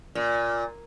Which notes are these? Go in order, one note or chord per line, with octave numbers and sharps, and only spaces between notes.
A#2